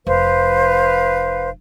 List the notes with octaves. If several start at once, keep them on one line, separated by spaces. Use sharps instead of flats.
F1 B4 C5 F5